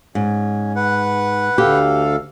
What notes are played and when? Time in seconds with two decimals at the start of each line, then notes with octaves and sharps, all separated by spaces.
0.15 G#2 C#4
0.76 B4 F#5
1.58 D2 G4 A4 F5